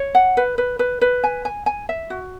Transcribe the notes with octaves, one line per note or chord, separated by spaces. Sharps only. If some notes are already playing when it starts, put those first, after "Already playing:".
Already playing: C#5
F#5
B4
B4
B4
B4
G#5
G#5
G#5
E5
F#4